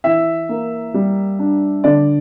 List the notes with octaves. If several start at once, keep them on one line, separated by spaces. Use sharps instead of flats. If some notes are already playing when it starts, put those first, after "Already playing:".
E3 E5
A#3
G3
D4
D3 D5